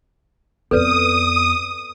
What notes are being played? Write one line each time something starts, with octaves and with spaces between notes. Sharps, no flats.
F2 B3 A4 B4 D5 D#6